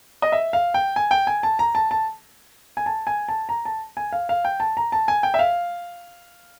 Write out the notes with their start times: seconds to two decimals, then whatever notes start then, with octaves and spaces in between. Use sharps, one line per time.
0.22 D#5
0.32 E5
0.53 F5
0.74 G5
0.96 G#5
1.11 G5
1.27 G#5
1.43 A5
1.59 A#5
1.75 A5
1.91 A5
2.77 G#5
2.86 A5
3.07 G#5
3.28 A5
3.49 A#5
3.65 A5
3.97 G#5
4.12 F5
4.29 F5
4.45 G5
4.60 A5
4.77 A#5
4.92 A5
5.08 G#5
5.23 G5
5.34 E5
5.39 F5